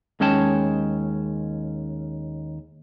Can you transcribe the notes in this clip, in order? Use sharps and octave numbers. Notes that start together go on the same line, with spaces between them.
D#2 G#3 C#4 C#5 G5 A5